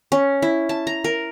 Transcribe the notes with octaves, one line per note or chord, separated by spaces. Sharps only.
C#4
E4
A5
A#5
A#4